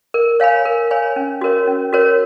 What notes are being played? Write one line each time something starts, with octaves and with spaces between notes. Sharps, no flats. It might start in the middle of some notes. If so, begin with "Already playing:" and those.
A#4
C#5 F5 G#5 B5
A#4
C#5 F5 G#5 B5
C#4
F#4 A#4 C#5
C#4
F#4 A#4 C#5